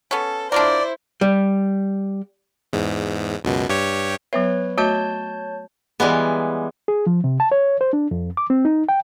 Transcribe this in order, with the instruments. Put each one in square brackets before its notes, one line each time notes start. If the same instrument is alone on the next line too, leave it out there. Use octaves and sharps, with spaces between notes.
[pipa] B3 C#4 [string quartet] A4
[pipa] D4 F4 A#4 [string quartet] E4 C5 [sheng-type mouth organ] D5
[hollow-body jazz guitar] G3
[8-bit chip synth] E2 G#2
C#2 F#2 B2
G2 G4 C#5
[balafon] F#3 B3 E5 [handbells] B4 C#5
[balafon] A3 F#4 D#5 [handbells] C#5 A5 G6
[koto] E3 G3 G#3 B3
[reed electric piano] G#4
F3
C3
A5
C#5
C5
D4
F2
D6
C4
D#4
G5